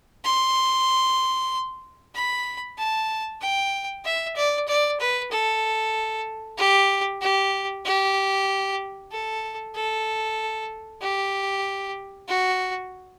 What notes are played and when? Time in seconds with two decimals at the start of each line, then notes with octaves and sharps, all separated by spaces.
0.24 C6
2.14 B5
2.78 A5
3.41 G5
4.05 E5
4.36 D5
4.68 D5
5.00 B4
5.31 A4
6.58 G4
7.21 G4
7.85 G4
9.11 A4
9.75 A4
11.02 G4
12.28 F#4